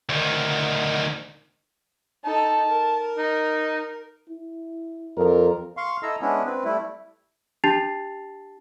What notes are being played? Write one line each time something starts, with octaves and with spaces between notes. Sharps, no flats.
D2 D#3
D#4 A4 A5
A#4
D#4
E4
F2 A#4
F5 C6 C#6
E4 A4 D#5 A#5 E6
G#3 B3 C#4 D4 E4
C4 B4
G3 A3 E4
D4 G4 A5 A6 C7 F7